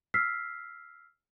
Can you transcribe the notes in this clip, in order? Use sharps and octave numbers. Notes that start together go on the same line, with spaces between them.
E6 F6 B6 C7